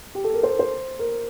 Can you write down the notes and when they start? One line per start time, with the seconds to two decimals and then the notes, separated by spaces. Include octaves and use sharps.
0.15 G4
0.24 A4
0.33 A#4
0.43 C5
0.51 A#4
0.59 C5
0.99 A#4